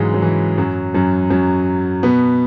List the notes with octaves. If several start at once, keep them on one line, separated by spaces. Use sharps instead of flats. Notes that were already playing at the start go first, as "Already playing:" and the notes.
Already playing: G#2 C#3 E3 F#3 G#3 C#4
F#3
E3
F#2 F#3
F#2 F#3
F#2 F#3
B2 B3